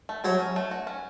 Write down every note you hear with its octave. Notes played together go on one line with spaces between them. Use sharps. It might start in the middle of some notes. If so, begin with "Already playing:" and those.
A3
F#3 A3
C#4
A3
F#4
C#4